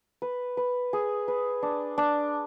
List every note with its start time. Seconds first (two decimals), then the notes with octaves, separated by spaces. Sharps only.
0.22 B4
0.57 B4
0.93 G#4
1.28 B4
1.63 D4
1.98 D4